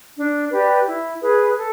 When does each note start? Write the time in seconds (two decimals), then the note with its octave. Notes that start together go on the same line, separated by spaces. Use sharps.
0.16 D4
0.51 G4 B4 D5
0.86 E4
1.22 G#4 B4
1.57 A4